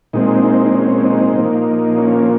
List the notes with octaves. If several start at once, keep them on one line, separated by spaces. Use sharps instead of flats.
A#2 G#3 C4 D#4
D#4
D#4
C#4
D#4
A#2 F3 A#3
C#4